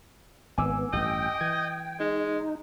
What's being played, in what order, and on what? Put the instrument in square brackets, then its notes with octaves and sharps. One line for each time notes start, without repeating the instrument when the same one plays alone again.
[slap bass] G#1 [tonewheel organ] B3 [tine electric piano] G#5 D6 E6
[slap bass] A1 G2 [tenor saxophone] D#5 [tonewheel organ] G5
[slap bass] E3 [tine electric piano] G#6
[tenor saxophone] G#3 [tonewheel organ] D#4